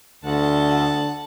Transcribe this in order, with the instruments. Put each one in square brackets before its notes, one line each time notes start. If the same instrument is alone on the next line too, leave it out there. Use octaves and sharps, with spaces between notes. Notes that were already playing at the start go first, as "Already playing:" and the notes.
[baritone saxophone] D2 [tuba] D3 [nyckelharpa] F#5 A5